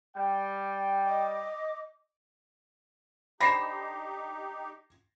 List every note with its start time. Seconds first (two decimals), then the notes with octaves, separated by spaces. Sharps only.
0.15 G3 G5
1.05 D#5 D6
3.40 D3 D#4 G4 C5 B5 A#6 C7 E7